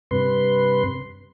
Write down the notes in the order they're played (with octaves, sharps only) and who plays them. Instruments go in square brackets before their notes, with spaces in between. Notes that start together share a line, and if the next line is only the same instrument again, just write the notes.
[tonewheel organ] G2 C3 B4 C6